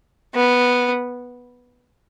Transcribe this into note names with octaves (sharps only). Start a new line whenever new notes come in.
B3